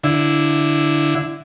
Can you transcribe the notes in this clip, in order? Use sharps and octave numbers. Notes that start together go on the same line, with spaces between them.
D3 E4